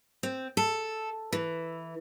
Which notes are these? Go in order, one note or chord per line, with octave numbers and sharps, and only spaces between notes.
C4
A4
E3